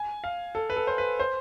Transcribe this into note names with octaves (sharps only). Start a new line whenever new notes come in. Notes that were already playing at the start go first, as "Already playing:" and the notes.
Already playing: G#5
F5
A4
B4
A4
C5
B4
C5